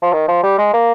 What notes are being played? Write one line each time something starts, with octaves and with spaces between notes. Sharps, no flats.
F3
D#3
F3
G3
G#3
A#3